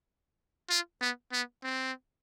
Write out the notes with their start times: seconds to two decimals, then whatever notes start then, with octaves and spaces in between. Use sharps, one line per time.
0.70 F4
1.01 B3
1.32 B3
1.64 C4